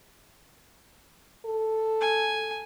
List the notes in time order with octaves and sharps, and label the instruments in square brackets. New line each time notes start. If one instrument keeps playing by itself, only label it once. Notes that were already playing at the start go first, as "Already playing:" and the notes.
[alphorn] A4
[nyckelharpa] G#5